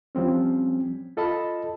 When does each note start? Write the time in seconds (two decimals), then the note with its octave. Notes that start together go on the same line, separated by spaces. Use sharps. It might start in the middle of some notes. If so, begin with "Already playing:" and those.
0.15 F3 G3 C4 C#4
1.17 F4 A4 D#5 A5 B5